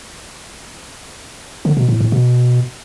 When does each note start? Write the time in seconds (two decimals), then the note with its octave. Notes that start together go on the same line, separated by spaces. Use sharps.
1.65 D3
1.77 B2
1.89 A2
2.00 A2
2.12 B2